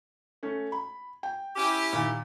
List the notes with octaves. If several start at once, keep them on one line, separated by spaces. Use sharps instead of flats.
A3 C#4
B5
G5
C#4 E4 G4
A#2 D#3